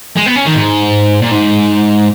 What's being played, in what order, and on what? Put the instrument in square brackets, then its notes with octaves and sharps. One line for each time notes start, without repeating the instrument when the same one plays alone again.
[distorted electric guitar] G#3
B3
C#4
D#3
G#2
A#2
G#2